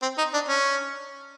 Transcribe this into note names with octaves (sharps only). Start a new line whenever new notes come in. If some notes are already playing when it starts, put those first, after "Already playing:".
C4
D#4
D4
C#4